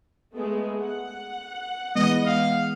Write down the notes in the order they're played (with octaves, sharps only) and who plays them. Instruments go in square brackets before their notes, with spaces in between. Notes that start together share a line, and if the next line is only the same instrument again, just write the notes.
[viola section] G#3 A3 B3
F#5
[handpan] E3 G#3 B3 [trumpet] D#5
[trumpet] F5